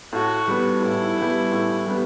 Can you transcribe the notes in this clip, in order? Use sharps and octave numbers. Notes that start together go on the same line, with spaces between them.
A2 F#4
G3 B3
A2 E4
G3 B3
A2
G3 B3